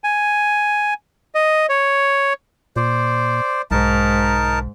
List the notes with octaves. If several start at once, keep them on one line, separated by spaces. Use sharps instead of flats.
G#5
D#5
C#5
A#2 C5 D5
B1 G#2 D#4 A#4 A5